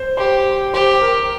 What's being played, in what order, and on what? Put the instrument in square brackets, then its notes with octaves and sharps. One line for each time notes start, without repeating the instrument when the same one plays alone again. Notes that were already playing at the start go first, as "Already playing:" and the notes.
Already playing: [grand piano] C5
[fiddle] G4 [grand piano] C5
[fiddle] G4 [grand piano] C5
[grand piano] A#4